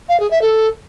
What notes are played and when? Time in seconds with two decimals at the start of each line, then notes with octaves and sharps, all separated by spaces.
0.09 F5
0.20 G#4
0.31 E5
0.42 A4